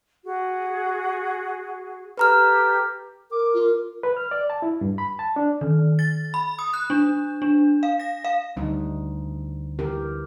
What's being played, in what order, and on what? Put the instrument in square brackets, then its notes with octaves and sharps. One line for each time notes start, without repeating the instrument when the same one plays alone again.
[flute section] F#4 G#4
[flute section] G4 A4 [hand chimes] B4 A#5 F6
[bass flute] A#4 [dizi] D6
[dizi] F4
[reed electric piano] B4
F6
D5
A5
E4
G2
B5
A5
D4
[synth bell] D#3
A6
B5
D#6
F#6
D4
D4
F5
A#6
F5
[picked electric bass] D2 [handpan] G3 D#4
[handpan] E3 G4 A#4